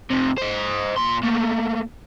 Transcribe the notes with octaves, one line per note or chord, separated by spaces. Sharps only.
F2 C3
C5 D#5
A#2 C6
A3 A#3